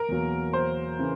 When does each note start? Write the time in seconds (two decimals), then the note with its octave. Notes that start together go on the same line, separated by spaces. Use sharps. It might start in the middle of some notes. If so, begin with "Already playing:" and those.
Already playing: A#4
0.09 E2 B2 F#3 A#3
0.53 C5
0.99 C#3 E3